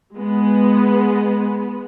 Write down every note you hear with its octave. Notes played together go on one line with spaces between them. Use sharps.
G#3 B3